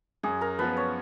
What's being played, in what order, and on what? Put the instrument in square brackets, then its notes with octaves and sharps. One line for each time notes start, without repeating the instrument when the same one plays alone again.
[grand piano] F#2 [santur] G#4
[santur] A#4
[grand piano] F3 B3 F4 [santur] B4
[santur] C#5